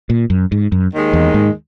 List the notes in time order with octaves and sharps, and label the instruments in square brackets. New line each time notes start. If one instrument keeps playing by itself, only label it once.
[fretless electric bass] A#2
F#2
G#2
F#2
[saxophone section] D#2 D#3 G#3
[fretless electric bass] E2
G#2